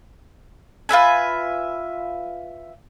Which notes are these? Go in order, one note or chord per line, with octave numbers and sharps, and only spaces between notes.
F4 B4 E5 G#5